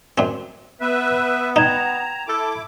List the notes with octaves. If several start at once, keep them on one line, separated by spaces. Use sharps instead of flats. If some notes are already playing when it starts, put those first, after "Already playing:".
F#2 C4
B3 B4 E5
D#4 G5 A#5 G#6 E7
E4 A4 D6